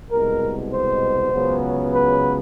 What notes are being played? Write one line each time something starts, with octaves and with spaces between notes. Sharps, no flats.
C2 B2 G#3 A#4
C5
C#2 C#3 F#3 B3
B4